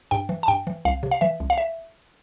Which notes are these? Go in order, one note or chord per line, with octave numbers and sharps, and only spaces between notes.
G2 G5
E3
A5
G2 G5
E3
C2 F5
C3
F5
E3 E5
C2
F5
E5